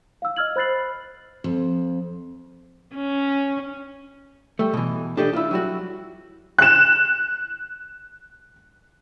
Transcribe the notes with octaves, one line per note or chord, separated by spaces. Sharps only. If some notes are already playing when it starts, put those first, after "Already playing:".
F5 E6
D#5 E6 F6 G#6 F#7
C5 B5 F#6 A6 C7 F#7
F2
C#4
G3 A3
B2 E3
D4 G4 A4 D#5
E4 F4
F#3 G3 E4 F#4
F#6 E7